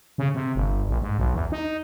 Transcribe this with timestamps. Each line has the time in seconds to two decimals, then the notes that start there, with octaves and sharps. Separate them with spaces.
0.18 C#3
0.35 C3
0.55 G1
0.89 A#1
1.02 G#2
1.18 B1
1.34 E2
1.52 D#4